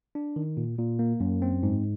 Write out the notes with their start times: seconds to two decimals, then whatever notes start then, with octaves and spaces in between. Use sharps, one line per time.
0.15 D4
0.36 D#3
0.57 A#2
0.78 A#2
0.99 A#3
1.20 F#2
1.42 C4
1.63 G#2